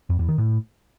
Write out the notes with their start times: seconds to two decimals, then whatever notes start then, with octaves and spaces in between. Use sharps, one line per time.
0.10 F2
0.19 E2
0.29 D#3
0.38 A2